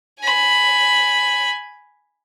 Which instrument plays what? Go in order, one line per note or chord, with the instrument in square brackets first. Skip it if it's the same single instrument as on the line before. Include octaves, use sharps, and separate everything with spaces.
[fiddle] G#5 B5